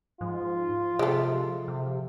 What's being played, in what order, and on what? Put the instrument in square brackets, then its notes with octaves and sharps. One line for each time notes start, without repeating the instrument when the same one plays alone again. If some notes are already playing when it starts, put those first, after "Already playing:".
[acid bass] G#2 [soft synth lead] F3 [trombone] F4
[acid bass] C3 [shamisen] G#3 A3
[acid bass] C3